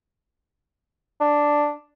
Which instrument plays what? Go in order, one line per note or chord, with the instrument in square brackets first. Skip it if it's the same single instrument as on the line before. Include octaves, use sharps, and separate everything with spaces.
[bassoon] D4